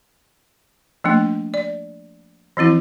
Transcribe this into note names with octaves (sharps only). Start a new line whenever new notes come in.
F3 A3 A#3 D4
D5
E3 F3 C4 E4